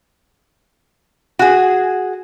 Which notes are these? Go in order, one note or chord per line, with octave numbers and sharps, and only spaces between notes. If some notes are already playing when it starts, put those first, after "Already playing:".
F#4 G#4